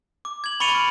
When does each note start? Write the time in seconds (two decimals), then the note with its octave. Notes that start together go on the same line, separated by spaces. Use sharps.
0.25 D6
0.44 G#6 F#7
0.60 B5 C#6 A6 C#7 D#7 F7
0.74 F6 D7